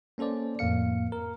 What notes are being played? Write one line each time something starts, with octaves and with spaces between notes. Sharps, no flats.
A#3 C#4 A4 C5 D5
F2 A2 A#3 F5 C#7
A#4